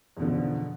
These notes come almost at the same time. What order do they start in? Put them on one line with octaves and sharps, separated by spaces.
E2 B2 D3 F3